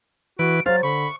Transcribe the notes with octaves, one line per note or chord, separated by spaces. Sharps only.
E3 F#4 B4 D7
F#3 C5 F5 A6
D3 B5 C#6